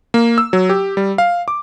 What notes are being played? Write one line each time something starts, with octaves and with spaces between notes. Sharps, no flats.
A#3
E6
F#3
G4
G3
F5
D6